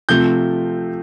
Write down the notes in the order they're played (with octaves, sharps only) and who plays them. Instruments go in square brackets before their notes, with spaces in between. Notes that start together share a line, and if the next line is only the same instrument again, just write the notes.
[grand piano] C3 F3 A3 G6